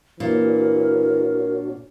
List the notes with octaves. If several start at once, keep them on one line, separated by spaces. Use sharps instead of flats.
A#2 E3 D4 F#4 A#4 C#5